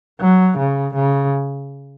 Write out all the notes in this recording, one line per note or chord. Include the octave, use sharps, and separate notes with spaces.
F#3
C#3
C#3